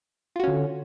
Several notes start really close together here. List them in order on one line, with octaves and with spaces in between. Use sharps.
F4 F#4 C#4 D3